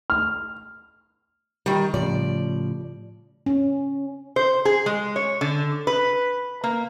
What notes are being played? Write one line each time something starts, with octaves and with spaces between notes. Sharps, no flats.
F6
D#3 G3
A2 C#3 F3 D5
C#4
C5
G#4
G#3
C#5
D3
B4
A#3